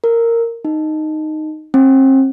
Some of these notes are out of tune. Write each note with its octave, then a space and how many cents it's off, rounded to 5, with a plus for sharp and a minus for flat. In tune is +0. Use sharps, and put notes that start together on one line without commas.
A#4 -10
D#4 -5
C4 +35